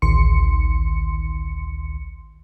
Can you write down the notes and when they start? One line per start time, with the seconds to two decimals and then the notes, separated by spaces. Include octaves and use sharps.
0.02 A1 D2 D#3 C6 C#7